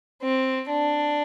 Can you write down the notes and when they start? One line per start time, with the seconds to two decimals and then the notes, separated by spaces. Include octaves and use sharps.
0.22 C4
0.69 D4